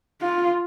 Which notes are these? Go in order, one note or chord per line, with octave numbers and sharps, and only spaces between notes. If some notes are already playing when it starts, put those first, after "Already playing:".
F4